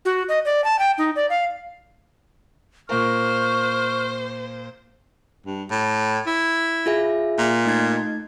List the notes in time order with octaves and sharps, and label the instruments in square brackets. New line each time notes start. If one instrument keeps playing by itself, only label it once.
[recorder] F#4
D#5
D5
A5
G5
D#4
D5
F5
[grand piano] A#2 A#3 A#4 [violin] C5 [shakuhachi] C#6 [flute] F6
[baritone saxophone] G2
A2
E4
[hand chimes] F4 G#4 E5
[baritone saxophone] A#2
[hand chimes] A3 D#4 G#6